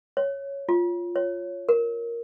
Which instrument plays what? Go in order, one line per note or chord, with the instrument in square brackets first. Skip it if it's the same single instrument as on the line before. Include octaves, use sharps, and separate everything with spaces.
[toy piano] C#5
F4
C#5
A#4